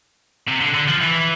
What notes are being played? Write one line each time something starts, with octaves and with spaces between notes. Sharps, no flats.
C3
D3
D3
F3
E3